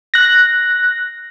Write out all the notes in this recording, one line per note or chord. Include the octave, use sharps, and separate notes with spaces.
F#6 A#6